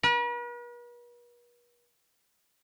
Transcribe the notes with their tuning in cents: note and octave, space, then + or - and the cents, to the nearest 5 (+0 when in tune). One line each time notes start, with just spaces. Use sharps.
B4 -45